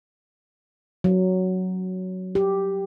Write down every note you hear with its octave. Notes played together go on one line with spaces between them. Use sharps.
F#3
G4